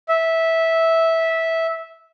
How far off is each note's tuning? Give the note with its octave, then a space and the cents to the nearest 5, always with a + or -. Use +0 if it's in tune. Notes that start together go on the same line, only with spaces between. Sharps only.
E5 -15